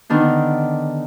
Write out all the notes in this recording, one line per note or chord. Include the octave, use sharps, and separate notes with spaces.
D3 D#3 B3 D4